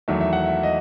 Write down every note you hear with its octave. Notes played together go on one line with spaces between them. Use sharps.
E2 D#3 F#3 A3 E5
E5
F#5
E5
D#5